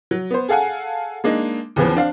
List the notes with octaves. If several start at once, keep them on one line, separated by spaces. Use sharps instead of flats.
F#3
B3 C5
G#4 A4 F5 F#5 G#5
G#3 A#3 D4 D#4
D#2 C#3 E3 F3 B3
C4 D4 F5